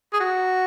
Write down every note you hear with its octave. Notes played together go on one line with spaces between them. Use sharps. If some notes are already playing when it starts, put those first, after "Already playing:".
G#4
F#4